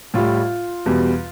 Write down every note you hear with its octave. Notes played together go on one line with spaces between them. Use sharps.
A2 G3 F4
E2 B2 G3